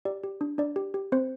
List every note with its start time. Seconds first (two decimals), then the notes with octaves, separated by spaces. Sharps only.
0.05 G4 D5
0.23 G4
0.41 D4
0.58 D4 D5
0.76 G4
0.94 G4
1.12 C4 C5